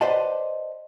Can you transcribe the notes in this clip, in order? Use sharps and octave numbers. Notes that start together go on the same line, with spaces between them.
B4 C5 D5 D#5 F#5 A5